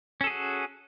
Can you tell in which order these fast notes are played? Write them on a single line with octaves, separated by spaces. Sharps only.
C#4 A4 G#4 F#4